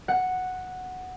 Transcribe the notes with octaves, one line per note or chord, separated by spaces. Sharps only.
F#5